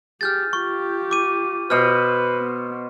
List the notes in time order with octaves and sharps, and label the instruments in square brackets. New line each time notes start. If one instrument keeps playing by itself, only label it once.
[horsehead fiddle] G4 G#4 [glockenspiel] F6 G6 A6
[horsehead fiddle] F4 G4 [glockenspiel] C#6
[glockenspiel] D6 D#7
[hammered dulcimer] B2 C5 [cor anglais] B4 [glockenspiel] F6
[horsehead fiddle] B3